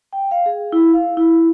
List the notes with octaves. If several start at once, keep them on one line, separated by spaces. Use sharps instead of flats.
G5
F5
G#4
E4
F5
E4